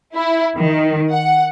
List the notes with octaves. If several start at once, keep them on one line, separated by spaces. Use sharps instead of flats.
E4
D#3
F#5